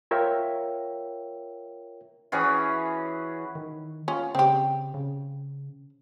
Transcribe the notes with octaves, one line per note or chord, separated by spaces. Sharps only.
F4 A#4 C#5 E5 G5
E3 C#4 F#4 G#4
D#3
C#4 F4
C#3 C4 G4
C#3